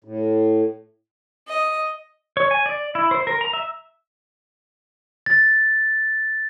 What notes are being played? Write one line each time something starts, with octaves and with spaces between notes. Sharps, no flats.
A2
D#5
C#5
G#5
D5
E4
C5
A#4
A#5
E5
A6